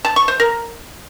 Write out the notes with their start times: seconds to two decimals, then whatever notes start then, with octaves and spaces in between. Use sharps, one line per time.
0.05 A5
0.16 C#6
0.28 C5
0.40 A#4